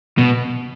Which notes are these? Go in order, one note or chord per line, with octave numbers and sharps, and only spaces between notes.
B2